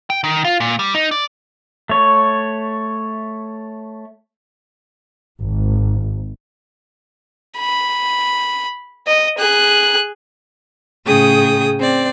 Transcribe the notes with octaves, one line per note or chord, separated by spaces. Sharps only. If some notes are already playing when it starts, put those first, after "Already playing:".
G5
D#3
F4
A#2
G3
D#4
D5
A3 C#5
G#1
B5
D#5
G#4 F#6
A2 C#3 G#4 G5 D#6
C4 D5